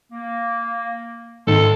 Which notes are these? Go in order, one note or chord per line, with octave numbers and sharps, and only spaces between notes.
A#3
G#2 D#3 A4 F5 A5 C6